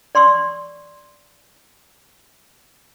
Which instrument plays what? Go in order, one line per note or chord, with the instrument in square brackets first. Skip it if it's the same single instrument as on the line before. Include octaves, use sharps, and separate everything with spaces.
[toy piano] D5 C6 C#6 E6